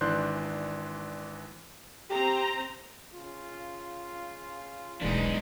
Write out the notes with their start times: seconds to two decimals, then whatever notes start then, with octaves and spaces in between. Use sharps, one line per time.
0.01 G#1 E3 D4 C6 F#6 G6
2.10 C4 G4 C5 A#5
3.15 C#3 F4
5.01 D#1 B1 E3 G#3 B3 D4 D#4